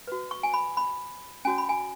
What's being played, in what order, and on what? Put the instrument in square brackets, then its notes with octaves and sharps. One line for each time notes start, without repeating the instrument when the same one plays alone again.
[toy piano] F#4 B4
C#6
G#5
B5
B5
C#4 F#4 C#5 G#5
B5
G#5